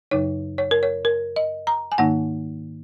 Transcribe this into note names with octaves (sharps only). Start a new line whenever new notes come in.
F#2 C#3 F#3 D#4 C#5
C#5
A#4
C#5
A#4
D#5
A#5
G#5
G#2 D#3 A#3 D#4 F#5